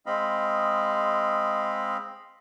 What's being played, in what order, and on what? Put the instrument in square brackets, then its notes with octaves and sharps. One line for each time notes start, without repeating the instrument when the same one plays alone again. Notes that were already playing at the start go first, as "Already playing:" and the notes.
[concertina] G#3 C4 D#5 F5 B5